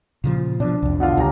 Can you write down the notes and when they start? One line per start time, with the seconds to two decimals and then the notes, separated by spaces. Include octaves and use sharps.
0.24 A#2 C#3 F3
0.60 B2 F3 D4
0.82 C2 F2
1.00 B2 D3 F4
1.17 D#1 C#2 G4 A#5